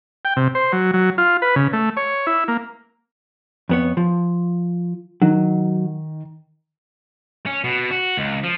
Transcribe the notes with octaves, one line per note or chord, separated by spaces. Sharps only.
G5
C3
C5
F#3
F#3
F4
B4
C#3
A3
C#5
E4
A#3
F2 B3 C#5
F3
D#3 F#3
C#4
B2
F#4
C#2
F3